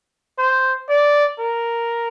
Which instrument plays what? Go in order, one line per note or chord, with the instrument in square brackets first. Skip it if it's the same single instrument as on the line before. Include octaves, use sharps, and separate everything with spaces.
[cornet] C5
D5
A#4